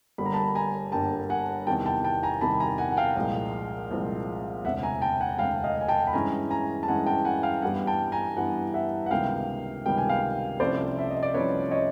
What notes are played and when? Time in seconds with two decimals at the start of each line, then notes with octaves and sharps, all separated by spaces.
0.18 G1 G2 D3 G3 A#3 B5
0.26 A#5
0.33 A5 B5
0.55 G#5 A#5
0.92 G1 G2 D3 G3 A#3 G5 A5
1.30 F#5 G#5
1.66 E2 C3 D#3 G3 G5 A5
1.86 G5 A5
2.04 G5 A5
2.23 G#5 A#5
2.41 E2 C3 D#3 G3 A5 B5
2.60 G#5 A#5
2.78 F#5 G#5
2.91 F#5
2.97 F5 G5
3.16 C2 A#2 F3 G#3 C4
3.91 C2 A#2 F3 G#3 C4
4.64 E1 D2 C3 E5 F#5
4.83 G#5 A#5
5.01 G5 A5
5.20 F#5 G#5
5.38 E1 D2 C3 F5 G5
5.64 D#5 F5
5.81 G#5
5.88 G5 A5
6.07 B5
6.13 G2 E3 G#3 C#4 G#5 A#5
6.50 G#5 A#5
6.83 A5
6.87 G2 E3 G#3 C#4 F#5 G#5
7.06 G5 A5
7.25 F#5 G#5
7.43 F5 G5
7.62 G2 E3 G3 B3 F#5 G#5
7.87 G5 A5
8.12 G#5 A#5
8.37 G2 E3 G3 B3 F#5 G#5
8.74 E5 F#5
9.06 F#5
9.11 C#2 C3 D#3 G3 B3 F5 G5
9.85 C#2 C3 D#3 G3 B3 G5
9.98 G#5
10.09 F5 G5
10.60 C2 C3 F3 A3 C#4 C5 D5
10.99 E5
11.10 D#5
11.23 D5
11.34 C2 C3 F3 A3 C#4 B4 C#5
11.71 C#5 D#5